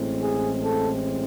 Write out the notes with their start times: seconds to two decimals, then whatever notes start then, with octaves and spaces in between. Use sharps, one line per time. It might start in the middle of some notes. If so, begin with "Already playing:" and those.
Already playing: A1 A2 G#3 C4
0.22 G#4
0.63 A4